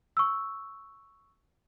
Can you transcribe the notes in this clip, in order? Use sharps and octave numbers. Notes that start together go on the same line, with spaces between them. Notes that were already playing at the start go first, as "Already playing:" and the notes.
C#6 E6